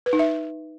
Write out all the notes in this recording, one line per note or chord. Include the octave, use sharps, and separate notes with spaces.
B4
D#4
E5